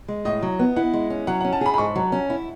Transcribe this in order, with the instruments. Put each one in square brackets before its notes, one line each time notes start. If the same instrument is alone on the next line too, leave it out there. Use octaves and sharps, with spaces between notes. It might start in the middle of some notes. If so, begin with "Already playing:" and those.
[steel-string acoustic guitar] G#3
[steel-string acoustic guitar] A2 [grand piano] D#5
[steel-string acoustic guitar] F#3
B3
[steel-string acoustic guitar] E4 [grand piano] F#5
[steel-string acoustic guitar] G#3
C#4
[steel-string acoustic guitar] F#3 [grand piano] F#5
[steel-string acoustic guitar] C#4 [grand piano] F#5
[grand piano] A5
[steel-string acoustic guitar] G#4 [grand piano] B5
[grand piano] B5
[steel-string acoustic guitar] G#2 [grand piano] C#6
[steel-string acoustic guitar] F#3
C#4
E4